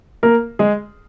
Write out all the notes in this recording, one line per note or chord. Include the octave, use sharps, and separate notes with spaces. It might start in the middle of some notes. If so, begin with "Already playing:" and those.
A#3 A#4
G#3 G#4